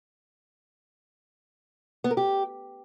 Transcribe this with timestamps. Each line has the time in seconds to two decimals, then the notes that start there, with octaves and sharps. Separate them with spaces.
2.04 B3
2.11 A#4
2.17 G4